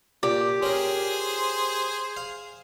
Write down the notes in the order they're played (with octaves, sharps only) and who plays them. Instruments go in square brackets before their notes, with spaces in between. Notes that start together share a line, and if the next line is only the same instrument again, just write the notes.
[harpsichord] A#2 [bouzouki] G4
[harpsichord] C#4 A#4 [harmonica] G#4 C5
[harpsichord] F5